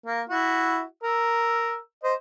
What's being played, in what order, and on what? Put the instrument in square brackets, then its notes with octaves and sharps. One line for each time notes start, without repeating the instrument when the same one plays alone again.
[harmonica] A#3
E4 F#4
A#4 E6
C5 D#5